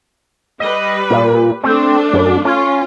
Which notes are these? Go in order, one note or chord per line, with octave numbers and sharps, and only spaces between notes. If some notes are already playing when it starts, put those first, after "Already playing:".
G3 B4 D#5
A#2
A3 C4 D4
F#2
C#4 F4